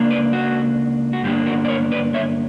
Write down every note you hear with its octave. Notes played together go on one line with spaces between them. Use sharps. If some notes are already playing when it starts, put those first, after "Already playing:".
Already playing: C#2 A#3 D4
B4 D5
F#4
F#4
G2 D3 A#3 D4 G4
F#4 A#4
D5
A#4 C#5
B4 D5
C#5 E5